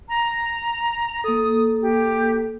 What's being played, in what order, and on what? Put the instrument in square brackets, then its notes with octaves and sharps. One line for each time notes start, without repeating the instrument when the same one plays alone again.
[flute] A#5
[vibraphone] A#3 A4 [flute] D#6
[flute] G4